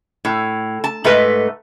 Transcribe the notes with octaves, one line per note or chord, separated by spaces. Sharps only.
A2
A5
G#2 A3 B4 D#5